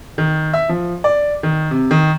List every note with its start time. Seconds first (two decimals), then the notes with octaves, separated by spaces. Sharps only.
0.18 D#3
0.53 E5
0.69 F3
1.04 D5
1.43 D#3
1.71 C3
1.91 D#3